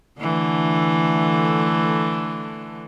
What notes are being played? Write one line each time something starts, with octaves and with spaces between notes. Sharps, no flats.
D3 E3 A3